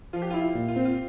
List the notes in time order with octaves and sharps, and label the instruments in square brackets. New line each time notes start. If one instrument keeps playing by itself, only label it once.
[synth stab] F3 [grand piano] F4
[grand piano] G4
F4
[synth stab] E4
[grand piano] F4
[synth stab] A#2
[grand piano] F4
[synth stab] C4
[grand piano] F4